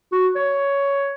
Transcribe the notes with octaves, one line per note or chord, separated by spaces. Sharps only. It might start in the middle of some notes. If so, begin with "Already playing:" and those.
F#4
C#5